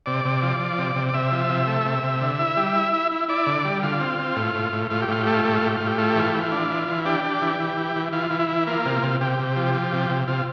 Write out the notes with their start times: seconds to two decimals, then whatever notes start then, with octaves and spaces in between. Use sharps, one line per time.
0.06 C3 D5
0.25 C3
0.42 F3
0.60 F3
0.78 C3
0.96 C3
1.09 D5
1.14 C3 E5
1.32 F3
1.49 C3
1.67 A3
1.85 C3
2.03 C3
2.21 D3
2.39 E4
2.57 G3
2.75 E4
2.93 E4
3.12 E4
3.28 E4 D5
3.47 D3
3.65 G3
3.83 D3 F4
4.00 C4
4.19 C4
4.36 A2
4.55 A2
4.73 A2
4.90 A2 F4
5.02 G4
5.08 A2 F4
5.23 A3 G4
5.34 F4
5.45 A2 G4
5.56 F4
5.62 A2 G4
5.77 A2 F4
5.87 G4
5.98 A3 F4
6.09 G4
6.15 E3 F4
6.30 E3 G4
6.42 F4
6.52 D4
6.70 E3
6.88 E3
7.05 D4 G4
7.24 D4
7.42 E3
7.60 E3
7.77 E3
7.96 E3
8.13 E3 F4
8.30 E3
8.39 E4
8.48 E3
8.67 A#3 F4
8.85 C3
9.03 C3
9.21 C3 G4
9.39 C3
9.56 F3
9.74 F3
9.93 C3
10.10 C3
10.28 C3 F4